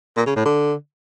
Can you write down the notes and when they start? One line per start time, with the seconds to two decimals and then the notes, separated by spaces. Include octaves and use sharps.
0.17 A#2
0.26 C#3
0.36 A2
0.45 D3